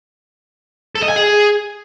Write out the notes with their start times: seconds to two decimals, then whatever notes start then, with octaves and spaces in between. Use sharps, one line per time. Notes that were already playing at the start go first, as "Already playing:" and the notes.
0.95 A4
1.02 D#5
1.09 G#5
1.16 G#4